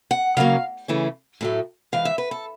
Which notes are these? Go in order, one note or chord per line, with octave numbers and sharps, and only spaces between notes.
F#5
C#3 F#3 A#3 C#4 F5
C#3 E3 A3 C#4
A2 F#3 A3
G#2 E3 G#3 F5
E5
B4
A4